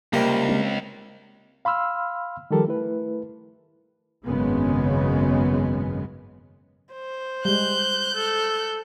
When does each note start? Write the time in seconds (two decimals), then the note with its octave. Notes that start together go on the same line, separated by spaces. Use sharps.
0.13 C#2 C3 G3 A#3 A#4
0.48 G#3 C4 C#4
1.65 F5 B5 C6 E6 F6
2.51 D#3 F3 G3 G4 A4 A#4
2.67 A3 E4 B4
4.25 G#1 F#2 C#3 G#3 B3
6.94 C5
7.45 G3 G#3 F#6 G6
8.15 A4